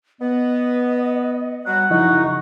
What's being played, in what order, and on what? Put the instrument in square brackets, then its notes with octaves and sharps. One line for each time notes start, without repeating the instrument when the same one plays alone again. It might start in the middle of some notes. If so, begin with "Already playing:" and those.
[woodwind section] B3 [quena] D#5
[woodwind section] F#3 G3 F#4 [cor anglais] F#5
[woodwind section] F#2 C#3 D#4 [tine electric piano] F3 E4 D#5 [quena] C#6